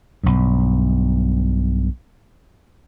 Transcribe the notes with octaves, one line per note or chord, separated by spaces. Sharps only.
B1 G2